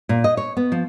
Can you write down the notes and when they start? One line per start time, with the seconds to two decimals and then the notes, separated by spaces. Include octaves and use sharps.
0.09 A#2
0.24 D#5
0.37 C#5
0.57 B3
0.72 F3